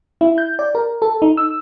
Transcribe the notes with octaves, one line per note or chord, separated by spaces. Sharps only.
E4
G6
D5
A#4
A4
D#4
E6